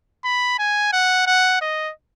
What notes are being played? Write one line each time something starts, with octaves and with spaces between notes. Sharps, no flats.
B5
G#5
F#5
F#5
D#5